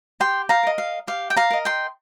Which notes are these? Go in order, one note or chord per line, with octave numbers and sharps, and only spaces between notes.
G4 G5 C6
F5 A#5
A#4 D#5
F5
G4 F5
G5
F5 A#5
A#4 D#5
G5 C6